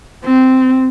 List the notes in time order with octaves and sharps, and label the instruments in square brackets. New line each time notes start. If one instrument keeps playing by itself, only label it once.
[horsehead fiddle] C4